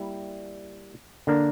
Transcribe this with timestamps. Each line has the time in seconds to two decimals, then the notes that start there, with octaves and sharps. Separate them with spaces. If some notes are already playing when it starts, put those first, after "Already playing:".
Already playing: G3 A#3 E4
1.27 D3 A#3 D4 A#4